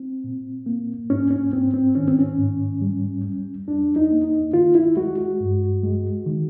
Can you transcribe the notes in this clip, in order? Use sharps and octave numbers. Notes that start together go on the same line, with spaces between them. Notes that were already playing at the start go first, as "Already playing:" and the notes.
Already playing: C4
A#2
A#3
G#2 C#4
C#4
G#2 C4
C4
D#3 C#4
C4
C#4
G#2
G3
G3
F2 D4
D#4
A#3
D#4
D#3 F4
E4
G#3 F#4
F#4
G2
G#3
D#3